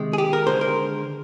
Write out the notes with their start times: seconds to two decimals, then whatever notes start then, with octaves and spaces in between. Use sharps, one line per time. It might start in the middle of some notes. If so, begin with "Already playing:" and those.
Already playing: C3 D#3 G#3
0.13 G#4
0.18 G4
0.33 A#4
0.47 D3 G#3 C5
0.61 A#4